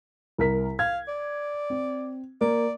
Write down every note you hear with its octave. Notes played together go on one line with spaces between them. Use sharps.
C2 A#4 B6
F5 G#6
D5
C4
A#3 D5